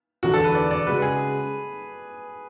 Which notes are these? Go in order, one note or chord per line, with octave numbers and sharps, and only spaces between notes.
E1 E2 D3 F#4
A4
B4
D5
D5
C#3 G#3 C#4 F#4 B4
G#4